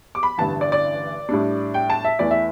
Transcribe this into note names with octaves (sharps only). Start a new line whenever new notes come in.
D6
B5
A1 G2 D3 A5
D5
D5
A2 G3 D4
G5
A5
E5
E2 E3 A3 E4 D5
E5